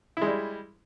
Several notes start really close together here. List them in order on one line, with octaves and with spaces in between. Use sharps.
E4 G#3 G3